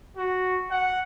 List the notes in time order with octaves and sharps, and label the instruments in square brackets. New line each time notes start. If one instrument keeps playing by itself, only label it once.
[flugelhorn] F#4
F#5